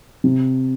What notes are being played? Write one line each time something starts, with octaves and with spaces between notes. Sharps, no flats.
C3